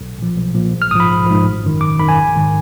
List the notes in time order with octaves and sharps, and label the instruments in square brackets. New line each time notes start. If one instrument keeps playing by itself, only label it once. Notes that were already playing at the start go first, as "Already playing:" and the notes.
[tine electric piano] B1
A#2 F3
B1
A#2 F3
A#1
F6
G#2 D#6
F3 B5
A#1
G#2 F3
G#1
F#2 D#3
G#1 D6
F#2 D#3 B5
G#5
A#1
G#2 D#3